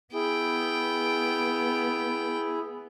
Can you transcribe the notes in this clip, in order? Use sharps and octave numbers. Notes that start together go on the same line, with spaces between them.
B3 E4 G#4 G5